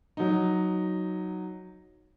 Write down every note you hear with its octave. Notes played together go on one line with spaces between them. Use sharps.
F#3 D#4